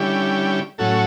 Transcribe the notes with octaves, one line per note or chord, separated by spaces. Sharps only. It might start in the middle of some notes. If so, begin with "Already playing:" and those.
Already playing: D3 G3 C#4 E4 G4
A2 F#3 C#4 F#4 A4